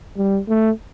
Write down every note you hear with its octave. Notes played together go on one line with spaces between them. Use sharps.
G3
A3